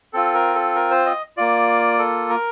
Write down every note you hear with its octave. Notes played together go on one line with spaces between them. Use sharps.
C4 F4 A4
A#4
A4
A#4
C5
D#5
A#3 F4 D5
A4
A#4